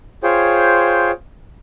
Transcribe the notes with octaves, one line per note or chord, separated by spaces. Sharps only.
F4 G#4 C5 C#5 G5